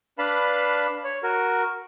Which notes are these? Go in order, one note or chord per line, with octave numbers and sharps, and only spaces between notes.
D4 B4 F5 A5 B5
C#5
F#4 A#4